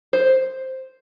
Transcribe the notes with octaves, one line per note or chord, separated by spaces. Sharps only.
C5